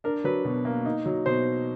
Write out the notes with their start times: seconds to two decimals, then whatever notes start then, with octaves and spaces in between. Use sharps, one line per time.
0.04 D4 A#4
0.24 F#3 B4
0.45 B2
0.65 A#3
0.86 D#4
1.06 F#3
1.26 B2 C5